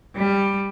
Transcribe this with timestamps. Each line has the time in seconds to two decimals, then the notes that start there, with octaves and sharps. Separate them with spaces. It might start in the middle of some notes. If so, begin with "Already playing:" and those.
0.16 G3